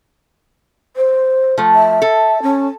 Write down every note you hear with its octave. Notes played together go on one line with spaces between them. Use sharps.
C5
F3 A3
E5
A4
C#4